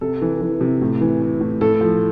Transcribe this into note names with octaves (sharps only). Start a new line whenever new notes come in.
C3 A4
E3
E3
C3
A2
E3
E3
A2
A2 A4
F3